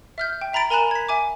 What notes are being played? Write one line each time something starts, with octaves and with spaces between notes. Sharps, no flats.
E5 F6 G6
G5
E5 A#5 B5 A6 D7
A#4 G#5 A#5 B5 F#6 E7
G#6 B6
E5 G#5 D6